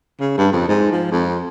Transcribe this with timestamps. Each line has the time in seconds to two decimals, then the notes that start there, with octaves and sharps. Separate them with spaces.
0.20 C#3
0.38 G2
0.53 F2
0.68 G#2
0.92 F3
1.11 F2